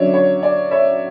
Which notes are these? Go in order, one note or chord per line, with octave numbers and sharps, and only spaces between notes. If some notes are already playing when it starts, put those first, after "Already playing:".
Already playing: D3 F#3 C#4 C#5 D5 E5
C#5
D5
C#5 E5